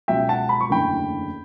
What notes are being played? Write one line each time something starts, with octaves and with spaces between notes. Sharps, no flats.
C#2 B2 F#3 E5 G5
F#5 A5
B5
C#6
F#1 E2 D3 A3 G5 B5